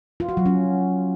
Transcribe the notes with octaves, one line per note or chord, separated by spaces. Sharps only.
F4
F#4
F#3
C#4